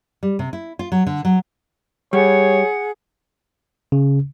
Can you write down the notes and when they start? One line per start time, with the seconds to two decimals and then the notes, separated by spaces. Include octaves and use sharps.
0.23 G3
0.39 C3
0.53 E4
0.79 F4
0.92 F#3
1.07 D3
1.25 F#3
2.13 G3 G#4 C#5 F#5
3.92 C#3